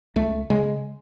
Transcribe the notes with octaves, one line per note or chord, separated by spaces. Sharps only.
C#2 A3
C#3 G#3